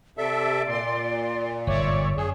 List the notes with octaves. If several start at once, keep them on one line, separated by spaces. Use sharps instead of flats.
C3 A4 D5 E5
A#2 C6
G1 G#2 C#5 D5 E5 C#6
F#2 G#4